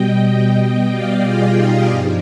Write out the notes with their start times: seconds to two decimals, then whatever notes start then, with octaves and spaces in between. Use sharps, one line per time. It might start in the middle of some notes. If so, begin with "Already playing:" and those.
Already playing: B2 G3 D#5 G5
0.58 D#5 G5
0.91 D5 F5
1.24 F4 G#4
1.57 D#4 G4
1.90 G2 F3